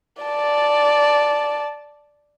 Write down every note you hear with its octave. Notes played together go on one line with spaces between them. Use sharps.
D5 A5